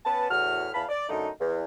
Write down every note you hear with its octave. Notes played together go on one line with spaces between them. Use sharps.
B3 C#4 B4 A5
E2 A2 F#4 F6
E2 F5 A5 B5
D5
F#2 D3 A3 D#4
E2